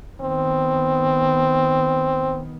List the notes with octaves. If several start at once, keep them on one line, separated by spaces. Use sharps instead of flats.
D#3 B3 C4